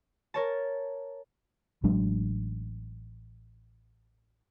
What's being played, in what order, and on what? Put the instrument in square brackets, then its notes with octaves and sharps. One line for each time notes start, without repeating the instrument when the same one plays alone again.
[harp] A#4 C#5 A5
[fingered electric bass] A1 F#3 G#3 D4